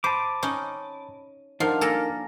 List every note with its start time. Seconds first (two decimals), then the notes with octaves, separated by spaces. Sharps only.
0.04 C5 A5 B5 D6 D#7
0.43 C#4 D#4
1.60 F3 D4 D#4 A#4 F#5 A5 F6
1.81 A#3 A4 G#5 A#6